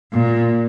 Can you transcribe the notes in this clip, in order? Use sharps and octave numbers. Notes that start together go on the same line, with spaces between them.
A#2